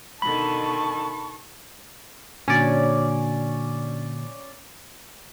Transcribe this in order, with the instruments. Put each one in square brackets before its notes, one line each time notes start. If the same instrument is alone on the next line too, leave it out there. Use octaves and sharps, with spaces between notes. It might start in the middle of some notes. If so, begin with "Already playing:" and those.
[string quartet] B2 D3 D#3 [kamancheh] A5 C#6 [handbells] B5
[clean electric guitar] A#2 D3 F#3 [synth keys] C#4 D5